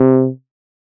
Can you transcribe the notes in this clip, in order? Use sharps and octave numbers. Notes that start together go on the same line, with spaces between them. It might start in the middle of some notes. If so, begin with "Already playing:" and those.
Already playing: C3